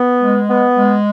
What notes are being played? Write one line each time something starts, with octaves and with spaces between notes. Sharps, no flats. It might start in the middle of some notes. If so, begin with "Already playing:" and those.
Already playing: B3
G#3
B3
G#3